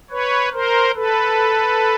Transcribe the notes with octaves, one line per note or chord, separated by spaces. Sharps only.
B4 C#5
A#4 C5
A4 B4